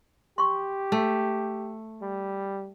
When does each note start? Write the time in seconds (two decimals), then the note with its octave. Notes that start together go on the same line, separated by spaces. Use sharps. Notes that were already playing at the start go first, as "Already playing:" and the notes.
0.38 G4 C6 C#6
0.92 A3
2.02 G3